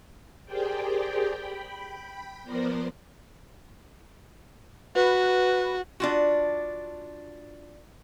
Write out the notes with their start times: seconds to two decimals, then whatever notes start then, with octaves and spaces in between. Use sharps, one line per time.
0.45 G4 G#4 A#4 C5 D5 G5
1.35 G5 B5
2.44 F3 B3 A#4 C5 D5 A#6
4.96 F#4 B4
6.00 D4 F4 F#4